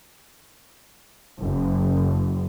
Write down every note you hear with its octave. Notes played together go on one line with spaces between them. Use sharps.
F#1